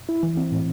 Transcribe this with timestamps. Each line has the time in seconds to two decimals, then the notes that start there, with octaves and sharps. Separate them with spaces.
0.09 E4
0.23 E3
0.37 C4
0.52 A2